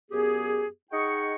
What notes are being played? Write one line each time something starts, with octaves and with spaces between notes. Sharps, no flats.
F#2 B3 G4 G#4
D#4 G#4 D#5 F#5 G5 C#6